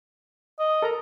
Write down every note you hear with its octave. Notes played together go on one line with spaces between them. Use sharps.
D#5
A4 A#4 A#5